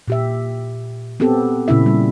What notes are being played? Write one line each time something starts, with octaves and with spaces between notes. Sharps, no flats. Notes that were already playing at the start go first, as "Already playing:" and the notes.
A#2 G4 E5
B3 C4 G4 A4
A#2 C#3 C#4 E4 E5
G3